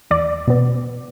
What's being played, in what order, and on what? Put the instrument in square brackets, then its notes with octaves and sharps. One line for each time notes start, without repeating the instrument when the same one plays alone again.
[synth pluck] E2 D5
B2 B3